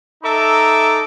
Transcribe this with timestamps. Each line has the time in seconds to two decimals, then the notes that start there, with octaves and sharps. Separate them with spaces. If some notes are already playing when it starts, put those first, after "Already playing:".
0.24 D#4 A4 E5 A#5 D6